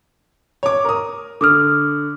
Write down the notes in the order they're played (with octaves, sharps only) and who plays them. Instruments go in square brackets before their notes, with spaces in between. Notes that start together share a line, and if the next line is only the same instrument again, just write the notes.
[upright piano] C#5 D6
A#4 D#6
[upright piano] D3 [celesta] D6 D#6 F6